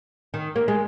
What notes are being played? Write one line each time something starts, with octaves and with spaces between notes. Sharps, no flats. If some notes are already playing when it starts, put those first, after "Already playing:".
D#3
A#3
G#3